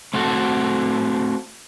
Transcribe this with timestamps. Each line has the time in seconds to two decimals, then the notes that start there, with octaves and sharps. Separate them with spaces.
0.14 A3 C4 F#4 A4